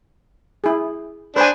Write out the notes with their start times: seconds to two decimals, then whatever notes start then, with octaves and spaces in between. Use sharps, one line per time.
0.64 E4 G#4
1.36 D4 B4 C5 G#5